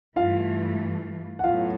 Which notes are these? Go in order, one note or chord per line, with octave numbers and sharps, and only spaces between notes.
G2 E3 A3 F4 F5
F#5
A2 F#3 B3 F4 F5